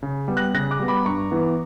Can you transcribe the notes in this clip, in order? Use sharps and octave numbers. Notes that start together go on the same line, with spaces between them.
C#3
G3 B3
F#6 A#6
C#3 F#6 A#6
D6 F#6
G3 B3
B5 D6
G2 A#5 C#6
E3 B3